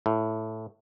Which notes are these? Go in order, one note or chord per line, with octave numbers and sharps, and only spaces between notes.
A2